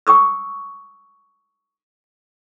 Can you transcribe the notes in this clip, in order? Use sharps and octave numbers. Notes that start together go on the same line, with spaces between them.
G5 C#6 D#6 E6